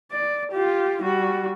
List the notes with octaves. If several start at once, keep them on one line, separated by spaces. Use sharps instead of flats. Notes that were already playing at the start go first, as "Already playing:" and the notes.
D5
F4 G4
G3 F#4